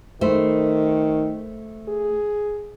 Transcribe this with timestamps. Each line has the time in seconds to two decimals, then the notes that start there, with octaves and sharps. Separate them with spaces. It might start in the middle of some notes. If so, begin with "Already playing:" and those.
0.21 D#3 A3 E4 C5
1.88 G#4